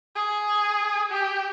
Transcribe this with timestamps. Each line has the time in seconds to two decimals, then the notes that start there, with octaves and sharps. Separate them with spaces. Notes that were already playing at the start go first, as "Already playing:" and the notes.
0.15 G#4
1.11 G4